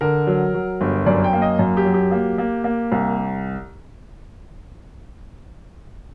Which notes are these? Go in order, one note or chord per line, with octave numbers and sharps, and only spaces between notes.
D3 A#4
F#3
F#3
G1
F#2 D5
G5
A#3
D#5
F#2
G4
F#3
G4
A#3
A#3
A#3
C2